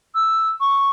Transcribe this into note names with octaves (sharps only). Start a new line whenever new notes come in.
E6
C#6